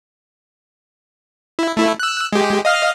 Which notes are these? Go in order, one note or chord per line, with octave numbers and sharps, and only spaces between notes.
E4
A3 E4
E6 F#6
G#3 G4
D#5 F5 F6